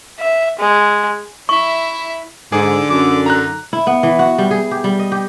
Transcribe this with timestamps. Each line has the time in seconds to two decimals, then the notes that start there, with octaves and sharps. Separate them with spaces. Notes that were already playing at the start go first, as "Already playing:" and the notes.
0.20 E5
0.59 G#3
1.49 E4 E5 C#6
2.52 G#2 D3 G#4 D6
2.90 F#2 D6
3.26 D#4 A#5 F#6
3.73 E4
3.87 B3
4.03 E3
4.19 F#4
4.38 G3
4.51 G#4
4.71 G4
4.84 G3
4.99 D#5
5.12 G4